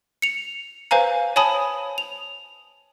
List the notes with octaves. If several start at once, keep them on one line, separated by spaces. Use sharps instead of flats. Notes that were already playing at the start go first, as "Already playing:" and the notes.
C#7 F7
B4 C5 F5 G#5 A#5
C#5 G#5 A5 B5 D#6
F7